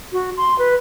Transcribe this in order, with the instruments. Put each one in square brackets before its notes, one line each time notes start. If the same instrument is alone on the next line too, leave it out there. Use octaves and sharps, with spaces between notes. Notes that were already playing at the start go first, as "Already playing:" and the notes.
[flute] F#4
C6
B4